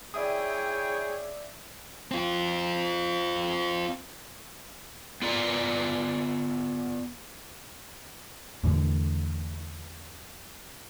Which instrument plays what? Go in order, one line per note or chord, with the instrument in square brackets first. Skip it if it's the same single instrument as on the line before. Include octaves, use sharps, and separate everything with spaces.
[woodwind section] E4 G5 [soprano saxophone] G#4 [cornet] C#5 [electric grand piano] D5 E5 D#6
[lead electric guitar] C4 F4
[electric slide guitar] B3 F4 D5 A#5
[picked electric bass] E2 A2 D3